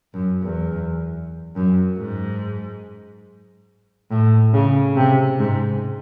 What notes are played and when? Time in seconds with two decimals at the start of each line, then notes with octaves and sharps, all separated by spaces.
0.14 F#2
0.43 E2
1.56 F#2
1.98 G#2
4.11 A2
4.54 C#3
4.96 C3
5.39 G#2